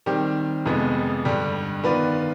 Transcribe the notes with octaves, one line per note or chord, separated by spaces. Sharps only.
D#3 G3 C4 G4
F2 C3 F3 G#3 B3
G2 D3 G3
D#3 B3 F4 B4 D5